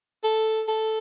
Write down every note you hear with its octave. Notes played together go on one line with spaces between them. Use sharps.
A4
A4